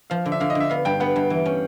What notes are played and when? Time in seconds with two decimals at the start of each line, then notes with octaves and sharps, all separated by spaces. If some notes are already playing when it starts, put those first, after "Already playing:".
0.10 F3 F5
0.26 D3
0.32 E5
0.40 D3 F5
0.50 D#5
0.55 D3
0.60 E5
0.70 B3 F5
0.85 G2 G5
1.00 B3 F#5
1.16 G2
1.30 E3
1.46 C#4